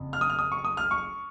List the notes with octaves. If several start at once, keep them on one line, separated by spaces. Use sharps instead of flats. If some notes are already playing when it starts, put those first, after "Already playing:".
Already playing: F#1 F2
F6
D#6
F6
D#6
C#6
D#6
F6
C#6